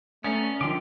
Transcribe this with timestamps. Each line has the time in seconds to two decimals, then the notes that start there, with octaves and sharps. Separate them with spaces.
0.24 A3 B3 C#4 D5 A#5
0.61 D3 D#3 F3 E5 C6 D6